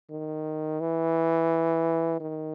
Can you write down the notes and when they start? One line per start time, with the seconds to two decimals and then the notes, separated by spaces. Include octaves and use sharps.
0.10 D#3
0.80 E3
2.20 D#3